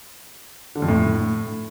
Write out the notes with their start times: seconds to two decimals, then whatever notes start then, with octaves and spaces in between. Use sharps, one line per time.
0.75 D3
0.82 F2
0.89 A2